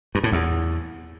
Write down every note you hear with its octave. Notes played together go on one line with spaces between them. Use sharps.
G2
A2
E2